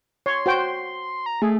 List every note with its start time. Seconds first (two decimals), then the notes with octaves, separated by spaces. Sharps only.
0.26 C#5 C6
0.46 F#4 C5 G5
1.26 A#5
1.42 A3 G#4